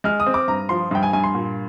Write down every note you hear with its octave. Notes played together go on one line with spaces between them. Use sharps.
G#3 F6
D#6
C4
D6
G2 A#5
F3 C6
G2 G5
G#5
G2 G#5
C6
A#2